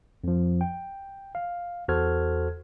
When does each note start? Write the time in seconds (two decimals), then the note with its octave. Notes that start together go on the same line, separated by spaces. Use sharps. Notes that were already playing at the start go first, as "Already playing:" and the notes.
0.24 F2 F3
0.61 G5
1.35 F5
1.88 E2 F#4 A4 C5 F6 G#6